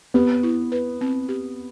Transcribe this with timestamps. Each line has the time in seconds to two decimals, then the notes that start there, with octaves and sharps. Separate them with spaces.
0.14 B3 G4
0.43 E4
0.72 B4
1.01 C4
1.29 G4